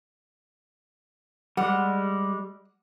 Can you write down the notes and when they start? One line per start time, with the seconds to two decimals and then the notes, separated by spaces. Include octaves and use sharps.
1.57 G3 G#3 F#5